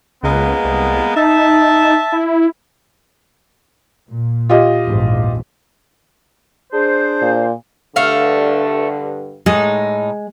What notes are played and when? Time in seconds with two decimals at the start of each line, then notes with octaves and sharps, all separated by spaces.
0.23 C#2 G#3 A#3 B3
0.64 C2
1.16 D#4 E5 A5
2.12 E4
4.08 A#2
4.49 F4 G4 D#5
4.85 A#1 E2 G#2
6.72 D4 G#4 C5
7.22 A#2
7.96 G2 D3 A3 F5
9.46 A2 G#3 D#4